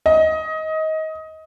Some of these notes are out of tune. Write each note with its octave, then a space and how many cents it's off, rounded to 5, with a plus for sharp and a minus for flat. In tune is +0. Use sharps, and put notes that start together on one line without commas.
D#5 +20